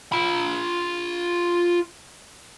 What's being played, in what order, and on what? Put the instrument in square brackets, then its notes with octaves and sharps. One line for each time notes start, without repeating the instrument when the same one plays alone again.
[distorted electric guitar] F4 B5